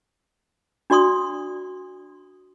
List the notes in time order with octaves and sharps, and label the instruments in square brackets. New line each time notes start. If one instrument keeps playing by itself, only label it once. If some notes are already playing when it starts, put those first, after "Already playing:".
[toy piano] D4 F#4 D5 C6 D#6